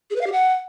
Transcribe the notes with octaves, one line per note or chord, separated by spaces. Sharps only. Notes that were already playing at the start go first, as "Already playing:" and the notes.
G#4
B4
F5
G4
F#5